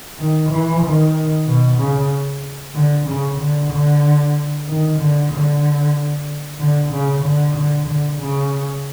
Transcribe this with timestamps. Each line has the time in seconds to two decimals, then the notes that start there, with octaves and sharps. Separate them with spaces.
0.19 D#3
0.50 E3
0.83 D#3
1.46 B2
1.79 C#3
2.74 D3
3.06 C#3
3.38 D3
3.71 D3
4.67 D#3
4.98 D3
5.31 D3
6.59 D3
6.92 C#3
7.23 D3
7.55 D3
7.87 D3
8.19 C#3